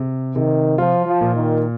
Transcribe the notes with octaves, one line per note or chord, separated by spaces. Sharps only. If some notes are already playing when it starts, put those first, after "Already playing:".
Already playing: C3
C3 D#3
F3 F4
F3
A#2
D#3